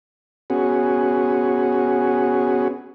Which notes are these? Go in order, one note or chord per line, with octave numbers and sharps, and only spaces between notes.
B3 C#4 F#4 G#4